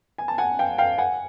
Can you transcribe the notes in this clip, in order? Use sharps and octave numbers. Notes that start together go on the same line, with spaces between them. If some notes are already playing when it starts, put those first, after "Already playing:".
G#5
A5
F#5 G#5
F5 G5
F5 G5
F#5 G#5